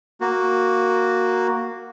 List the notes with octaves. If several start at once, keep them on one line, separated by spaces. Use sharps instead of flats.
A#3 F#4